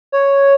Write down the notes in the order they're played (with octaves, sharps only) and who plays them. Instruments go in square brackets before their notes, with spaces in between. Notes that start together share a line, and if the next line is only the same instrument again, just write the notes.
[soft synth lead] C#5